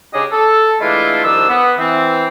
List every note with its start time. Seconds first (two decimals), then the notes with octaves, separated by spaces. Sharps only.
0.14 C#3 C#4 D4 G4 G#4 D#5
0.31 A4
0.80 E3 G#3 A3 D4 E4 F4
1.24 C2 D#3 F3 D4 E6
1.49 B3
1.79 E3 C4